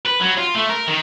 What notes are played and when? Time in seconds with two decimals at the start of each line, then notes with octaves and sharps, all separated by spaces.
0.06 B4
0.21 F#3
0.38 F4
0.55 A3
0.70 A#4
0.88 D#3